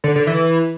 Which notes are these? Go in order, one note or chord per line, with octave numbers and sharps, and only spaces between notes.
D3
D3
E3